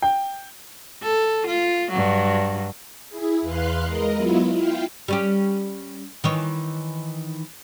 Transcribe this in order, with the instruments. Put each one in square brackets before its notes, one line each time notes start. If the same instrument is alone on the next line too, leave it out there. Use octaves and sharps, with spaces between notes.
[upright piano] G5
[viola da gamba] A4
F4
G2 F#3
[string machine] E4 G#4
E2 B4 F5 C6 F#6
G#3 A#4 D#5
F#3 B3 E4 F4
E4 F4 F5 G5
[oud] G3 C#4 G4
D#3 E3 C#5